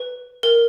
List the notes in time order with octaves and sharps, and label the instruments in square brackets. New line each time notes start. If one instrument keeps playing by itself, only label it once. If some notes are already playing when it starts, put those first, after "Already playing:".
Already playing: [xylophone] B4
A#4